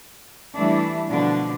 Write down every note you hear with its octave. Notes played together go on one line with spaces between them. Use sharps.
E3 G3 A3 D4 E4
B2 D3 F3 D4